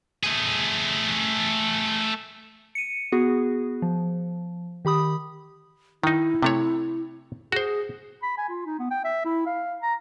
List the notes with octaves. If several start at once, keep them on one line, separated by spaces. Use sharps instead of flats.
A3 G#4
C#7 D#7
B3 F#4 G#4
F3
D#3 G4 B5 D#6
D#3 D#4 E4
C3 A3 C#5
F#4 G#4 C5
B5
G#5
F4
D#4
B3
G5
E5
E4
F5
A#5